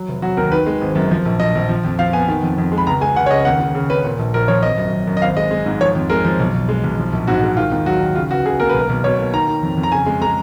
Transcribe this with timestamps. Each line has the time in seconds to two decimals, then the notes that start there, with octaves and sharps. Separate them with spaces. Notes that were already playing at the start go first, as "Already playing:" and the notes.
Already playing: F#3
0.08 F1
0.22 F#3 F#4
0.37 D#2 A#4
0.52 D#3 B4
0.66 G#3
0.81 G#1
0.95 F#2
1.11 F3
1.25 A#1
1.40 A#1 D#5
1.55 A#1
1.69 F3
1.85 F2
1.99 F3 F5
2.13 B3 G#5
2.28 D#3
2.43 F2
2.58 F2
2.72 G#3
2.78 B5
2.87 C#2 A#5
3.01 G#3 G#5
3.16 C#2 F#5
3.26 C#5
3.31 C#3 D#5
3.45 D#2 F#5
3.60 D#2
3.75 C#3
3.90 C#4 B4
4.05 A#2
4.19 A#1
4.34 A#1 A#4
4.48 F3 C#5
4.63 G#1 D#5
4.78 F#2
4.92 F#2
5.07 F#2
5.17 D#5
5.21 G#1 F5
5.36 G#3 D#5
5.51 G#3
5.66 G#2
5.81 F3 C#5
5.95 F2
6.10 G#3 A#4
6.25 F3
6.39 B1
6.54 B1
6.69 G#3
6.84 B1
6.98 F3
7.13 A#1
7.27 G#2 F#4
7.42 G#3
7.57 D#3 F4
7.72 D#2
7.86 F#3 F#4
8.01 D#3
8.15 C#3 F4
8.31 C#2 F#4
8.45 C#2 G#4
8.60 A#3 A#4
8.69 B1 B4
8.79 A#4
8.89 B1
9.04 B2 C#5
9.18 A#3
9.33 D#3 A#5
9.48 D#3
9.63 F2
9.77 F2
9.83 A#5
9.92 C#3 G#5
10.06 G#3
10.21 G#3 A#5